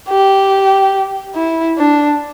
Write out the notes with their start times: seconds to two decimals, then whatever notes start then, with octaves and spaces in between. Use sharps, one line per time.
0.08 G4
1.35 E4
1.77 D4